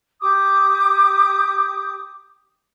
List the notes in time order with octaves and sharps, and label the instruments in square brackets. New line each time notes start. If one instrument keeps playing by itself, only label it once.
[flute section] G4 D6 D#6